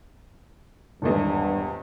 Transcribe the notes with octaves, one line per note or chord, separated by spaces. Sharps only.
D#1 G#1 E2 G2